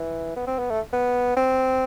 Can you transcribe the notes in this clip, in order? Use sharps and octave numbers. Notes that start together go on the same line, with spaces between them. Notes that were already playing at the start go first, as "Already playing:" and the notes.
Already playing: E3
B3
C4
B3
A3
B3
C4